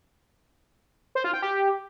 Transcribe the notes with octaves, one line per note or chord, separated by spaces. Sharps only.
C5
F4
G5
G4